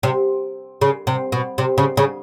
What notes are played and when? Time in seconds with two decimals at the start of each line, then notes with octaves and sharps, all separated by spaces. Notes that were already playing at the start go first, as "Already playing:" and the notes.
0.03 C3
0.81 C#3
1.07 C3
1.32 B2
1.58 C3
1.78 C#3
1.97 C#3